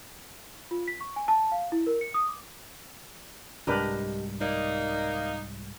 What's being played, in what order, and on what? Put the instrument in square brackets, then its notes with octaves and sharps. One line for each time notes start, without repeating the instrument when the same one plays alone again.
[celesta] F4
B6
C#6
G#5
A5
F5
E4
A#4
C#7
D#6
D6
[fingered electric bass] C2 G#2 G3 [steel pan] D4 A#4 B4 [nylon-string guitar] G4 D#5
[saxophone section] A#3 D#4 [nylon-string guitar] D5